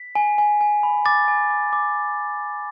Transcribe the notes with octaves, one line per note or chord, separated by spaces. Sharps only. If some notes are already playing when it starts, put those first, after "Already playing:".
Already playing: B6
G#5
G#5
G#5
B5
D6 A6
G#5
D6
D6